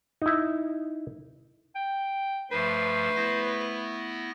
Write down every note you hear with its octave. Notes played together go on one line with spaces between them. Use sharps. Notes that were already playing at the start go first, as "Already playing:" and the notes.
D#4 E4
G5
G2 F3 A3 B4 C5
B3 E4 A#6